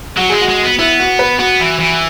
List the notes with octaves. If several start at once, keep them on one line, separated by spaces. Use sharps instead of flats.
F#3 F#4
G#3 G#4
F#4
G#3
B3
B3 E4
F#4
B4
B3 F#4
E3
E3